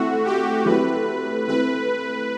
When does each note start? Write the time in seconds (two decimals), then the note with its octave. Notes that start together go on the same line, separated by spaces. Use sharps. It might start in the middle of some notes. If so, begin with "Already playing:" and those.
Already playing: A3 C4 E4 F#4
0.25 G4
0.66 F#3 A3 C4 E4 G4 B4
1.48 A3 C4 E4 B4